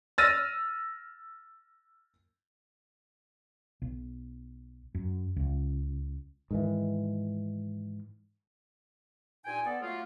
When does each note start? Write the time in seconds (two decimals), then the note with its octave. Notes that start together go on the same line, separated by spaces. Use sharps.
0.18 E6 F6 A6 A#6 D#7
3.82 B1
4.95 F#2
5.36 C#2
6.51 G#2 D#3 E3
9.45 G2 A#2 D#4 G5 G#5
9.65 B3 A4 D5
9.81 F#3 A3 A#3 F4